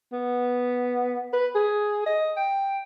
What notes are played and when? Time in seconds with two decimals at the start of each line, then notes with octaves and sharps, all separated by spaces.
0.13 B3
1.33 B4
1.55 G#4
2.06 D#5
2.37 G5